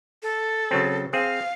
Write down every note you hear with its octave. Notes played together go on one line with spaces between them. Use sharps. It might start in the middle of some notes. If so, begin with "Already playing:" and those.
A4
C#3 F#3 C4
C4 G#4 F5